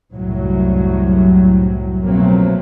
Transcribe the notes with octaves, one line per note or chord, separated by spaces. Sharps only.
C2 F#2 A2 F#3
B2 F3 F#3 A3 A#3 C4